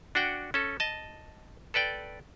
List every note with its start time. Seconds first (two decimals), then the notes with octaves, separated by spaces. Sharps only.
0.15 D4 F#4 F#5 G5
0.54 C#4 A4
0.80 D#5 A5
1.74 A4 B4 D5 G5